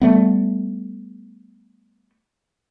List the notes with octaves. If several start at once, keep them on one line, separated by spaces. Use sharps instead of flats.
G3 A3 B3